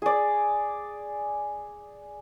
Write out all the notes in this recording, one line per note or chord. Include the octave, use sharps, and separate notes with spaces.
G#4 D5